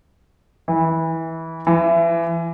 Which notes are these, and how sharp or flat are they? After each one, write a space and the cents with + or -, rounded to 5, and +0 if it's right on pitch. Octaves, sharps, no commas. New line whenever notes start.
E3 -20
E3 +25